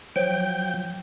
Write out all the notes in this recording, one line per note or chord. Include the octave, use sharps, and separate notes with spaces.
F3 F#3 G5 G6